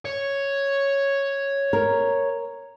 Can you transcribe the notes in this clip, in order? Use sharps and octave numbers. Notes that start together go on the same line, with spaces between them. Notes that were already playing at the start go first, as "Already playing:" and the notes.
C#5
A#4